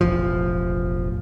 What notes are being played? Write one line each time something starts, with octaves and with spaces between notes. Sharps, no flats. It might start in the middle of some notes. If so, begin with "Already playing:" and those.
E1 A1 F3